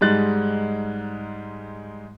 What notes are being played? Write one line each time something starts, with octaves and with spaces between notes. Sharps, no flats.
G#2 G3 G#3 D#4 F#6 A6